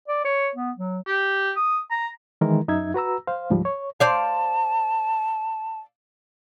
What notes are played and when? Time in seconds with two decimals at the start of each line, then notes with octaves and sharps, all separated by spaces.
0.08 D5
0.25 C#5
0.55 B3
0.78 F#3
1.07 G4
1.56 D#6
1.91 A#5
2.41 D#3 E3 G#3 E4 A#4
2.68 F#2 D#4 E5 G#6
2.94 F#4 B4 A#5 E6
3.27 C5 F5
3.50 D2 G#2 F3 G3
3.65 C#5
4.00 C5 D5 F5 A5